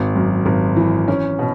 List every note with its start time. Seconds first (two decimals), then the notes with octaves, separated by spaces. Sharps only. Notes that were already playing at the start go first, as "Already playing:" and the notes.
Already playing: G#1
0.16 F#2
0.46 G#1
0.76 E3
1.08 C#4
1.39 B2